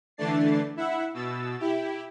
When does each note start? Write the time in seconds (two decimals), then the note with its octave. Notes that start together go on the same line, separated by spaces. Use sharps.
0.17 D3 E3 A3 D4 A6 C7
0.77 E4 E5 F#5
1.14 B2 E6 A6
1.59 E4 G4